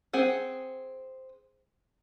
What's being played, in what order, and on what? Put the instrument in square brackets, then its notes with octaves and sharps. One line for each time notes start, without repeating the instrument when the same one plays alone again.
[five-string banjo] C4 G#4 F#5